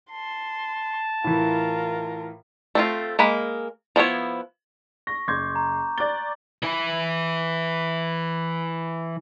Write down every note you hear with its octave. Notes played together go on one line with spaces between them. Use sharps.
A5 C6
A2 E3 F4 A#4
A3 C4 F4
G#3 A#3 B5
F3 B3 E4 C#5
C#6 A#6
F#1 C6 D6 G6 G#6
A#5
D5 F#6 A6 G7
E3 E4